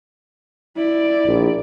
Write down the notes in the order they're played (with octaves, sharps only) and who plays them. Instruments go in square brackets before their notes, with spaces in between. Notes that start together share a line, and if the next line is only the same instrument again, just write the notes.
[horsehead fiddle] E4 D5
[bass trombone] A#1